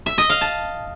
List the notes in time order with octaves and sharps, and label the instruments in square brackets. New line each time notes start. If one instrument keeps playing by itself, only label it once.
[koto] E5
D#5
F5
A5